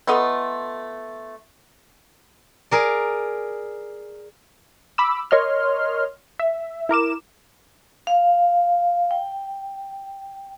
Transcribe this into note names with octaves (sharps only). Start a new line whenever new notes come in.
A3 B3 F4 D#5
G#4 A#4 D5
B5 D6 E6
A#4 C#5 D#5 C6 F6
E5
E4 A#4 D6 E7
F5
G5